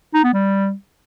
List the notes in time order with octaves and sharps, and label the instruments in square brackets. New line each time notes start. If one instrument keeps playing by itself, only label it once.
[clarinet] D#4
B3
G3